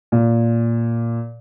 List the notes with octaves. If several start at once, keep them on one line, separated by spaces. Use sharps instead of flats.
A#2